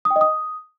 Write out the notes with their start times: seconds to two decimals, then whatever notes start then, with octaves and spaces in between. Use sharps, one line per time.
0.05 D#6
0.10 G5
0.16 D#5
0.21 D#6